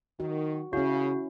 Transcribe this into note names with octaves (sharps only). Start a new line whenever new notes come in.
D#3 F#4
C#3 C#4 E4 F#4